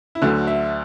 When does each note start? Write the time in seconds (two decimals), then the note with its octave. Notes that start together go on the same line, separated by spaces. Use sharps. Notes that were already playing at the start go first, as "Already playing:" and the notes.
0.15 E4
0.22 D2 D3 F#3 A3 F#4
0.47 E5